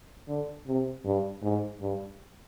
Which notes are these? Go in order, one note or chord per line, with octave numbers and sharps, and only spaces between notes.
D3
C3
G2
G#2
G2